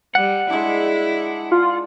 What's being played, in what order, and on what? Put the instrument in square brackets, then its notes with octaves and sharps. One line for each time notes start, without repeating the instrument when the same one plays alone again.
[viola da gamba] G3 [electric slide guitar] F#5
[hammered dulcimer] G#3 D4 [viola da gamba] E4
[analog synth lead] F4